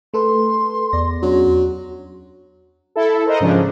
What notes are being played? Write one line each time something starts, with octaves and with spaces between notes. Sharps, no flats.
A3 A4 B4 C6
E2 D5 A#6
F#3 C#4 D4
E4 A4
A#4 C5 D#5 F#5
G#2 C#3 F3 D4